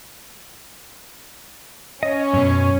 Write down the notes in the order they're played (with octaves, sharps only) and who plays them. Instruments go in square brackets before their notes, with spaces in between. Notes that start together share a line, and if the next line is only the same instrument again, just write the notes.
[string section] C#4 [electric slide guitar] D#5
[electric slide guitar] F#2 B2